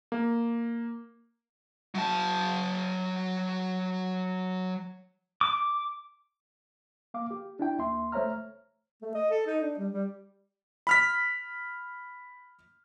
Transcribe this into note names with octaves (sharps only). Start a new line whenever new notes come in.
A#3
F#3 A5
D6
A#3 F5 D6
G4
D4 E4 G5
D2 A#3 E5 C6
A3 C5 C#5 E5 A#5 F6
A3
D#5
A4
D#4
D4
G3
G3
B5 F6 B6